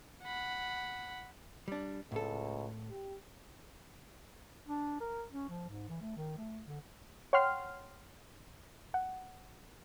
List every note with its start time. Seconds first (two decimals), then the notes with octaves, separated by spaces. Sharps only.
0.23 F#5 B5
1.68 G3 D4
2.12 C#2 A2 A4
2.90 G4
4.68 D4
5.00 A#4
5.32 C#4
5.50 F3
5.70 G#2
5.89 E3
6.01 A3
6.17 D#3
6.38 A3
6.66 D3
7.33 C#5 F#5 G5 C6 F6 C7
8.94 F#5